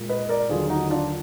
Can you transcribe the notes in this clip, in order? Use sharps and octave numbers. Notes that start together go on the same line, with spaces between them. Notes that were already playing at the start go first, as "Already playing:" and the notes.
Already playing: A#2 G#3
B4 D#5
A#4 D5
D#2 D3 F#3 F4 G#4
D#4 F#4
D4 F4